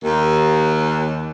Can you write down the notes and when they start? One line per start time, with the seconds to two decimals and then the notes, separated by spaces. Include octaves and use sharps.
0.03 D#2